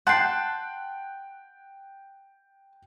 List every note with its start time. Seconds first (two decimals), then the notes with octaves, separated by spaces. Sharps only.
0.07 F#5 G5 A5 C6 F#6 G6 C7